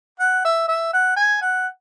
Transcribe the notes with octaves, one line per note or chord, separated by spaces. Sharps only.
F#5
E5
E5
F#5
G#5
F#5